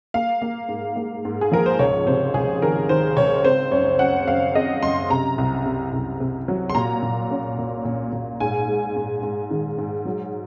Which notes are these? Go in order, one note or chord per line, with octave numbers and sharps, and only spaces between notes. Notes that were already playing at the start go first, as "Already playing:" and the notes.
A#3 F5
A#3
G#2
A#3
G#2
G#4
F3 A#4
C5
C#2 C#5
C3 C5
C#2 G#4
D#3 A#4
D#3 C5
C#2 C#5
C4 C5
F#2 C#5
F#2 F#5
F#2 F5
C4 D#5
F#2 C6
C3 A#5
C2
C3
C2
C3
F#3
C6
A#2 A#5
A#2
C#4
A#2
A#2
A#2
G#2 G#5
G#3
G#2
G#2
D#3
G#2
F#3